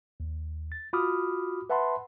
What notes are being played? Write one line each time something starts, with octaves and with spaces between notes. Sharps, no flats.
D#2
A6
F4 F#4 B5 D6 D#6 F6
B4 E5 F#5 A5 B5 C6